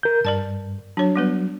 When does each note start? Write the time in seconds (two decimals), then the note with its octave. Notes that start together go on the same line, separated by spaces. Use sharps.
0.03 A#4 G6
0.25 G2 A#4 D5 A5
0.97 F#3 D4 C#5
1.16 G3 B3 B4